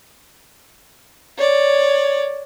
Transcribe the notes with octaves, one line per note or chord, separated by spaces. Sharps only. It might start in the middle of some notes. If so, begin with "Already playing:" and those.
C#5 D5